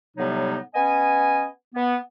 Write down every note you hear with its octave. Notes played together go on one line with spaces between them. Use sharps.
A2 C3 F#3 G3 B3 D#4
B3 C#4 D#5 G#5
B3